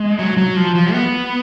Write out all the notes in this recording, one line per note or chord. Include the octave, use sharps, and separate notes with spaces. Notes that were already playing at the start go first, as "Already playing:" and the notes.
Already playing: G#3
F#3
F#3
F3
F3
B3